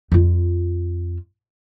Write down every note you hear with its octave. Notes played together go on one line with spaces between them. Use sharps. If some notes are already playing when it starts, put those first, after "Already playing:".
F2 F4